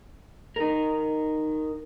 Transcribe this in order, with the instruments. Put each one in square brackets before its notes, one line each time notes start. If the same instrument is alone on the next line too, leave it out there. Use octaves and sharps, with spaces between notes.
[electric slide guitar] D#4 A#4